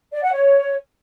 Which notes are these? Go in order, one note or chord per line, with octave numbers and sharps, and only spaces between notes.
D5
F#5
C#5